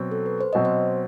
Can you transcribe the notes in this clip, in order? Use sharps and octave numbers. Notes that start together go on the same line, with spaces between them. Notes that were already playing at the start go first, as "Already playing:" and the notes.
Already playing: B2 F#3 C4
A4
B4
C5
B2 F#3 C4 D#5
C5